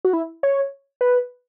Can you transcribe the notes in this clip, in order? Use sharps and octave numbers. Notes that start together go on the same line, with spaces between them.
F#4
E4
C#5
B4